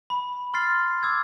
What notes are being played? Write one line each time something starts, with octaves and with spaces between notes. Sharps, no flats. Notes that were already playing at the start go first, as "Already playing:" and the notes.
B5
C6 F6 A6 C7
D6 E6 G#6